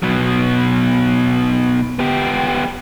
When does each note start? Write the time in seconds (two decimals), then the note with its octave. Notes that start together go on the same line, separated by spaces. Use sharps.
0.03 B2 F#3
1.99 B3 G4